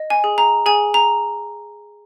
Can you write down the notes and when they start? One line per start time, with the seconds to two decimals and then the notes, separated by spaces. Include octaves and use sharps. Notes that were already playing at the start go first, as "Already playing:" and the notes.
Already playing: D#5
0.10 G#5
0.24 G#4
0.38 A#5
0.66 G#4 G#5
0.94 A#5